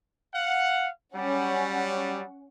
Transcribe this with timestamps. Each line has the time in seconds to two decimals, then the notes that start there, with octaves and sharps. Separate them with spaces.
0.34 F5 F#5
1.16 F#3 G3 C#4 F#5